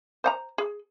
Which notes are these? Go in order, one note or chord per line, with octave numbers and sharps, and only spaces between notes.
C5 F#5 A#5
G#4